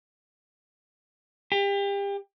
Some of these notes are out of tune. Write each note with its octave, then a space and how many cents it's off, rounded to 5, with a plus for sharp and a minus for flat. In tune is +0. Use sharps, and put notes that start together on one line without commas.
G4 +30